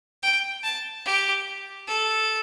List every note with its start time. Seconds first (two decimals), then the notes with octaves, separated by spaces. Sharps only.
0.23 G5
0.64 A5
1.05 G4
1.87 A4